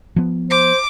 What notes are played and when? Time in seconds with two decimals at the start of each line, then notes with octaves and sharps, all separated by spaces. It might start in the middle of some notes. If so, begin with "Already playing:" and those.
0.16 F3 B3
0.50 C5 D6